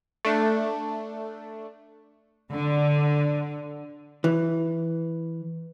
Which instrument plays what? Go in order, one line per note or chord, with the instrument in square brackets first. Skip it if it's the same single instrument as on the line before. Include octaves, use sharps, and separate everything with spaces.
[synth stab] A3 D4
[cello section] D3
[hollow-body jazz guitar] E3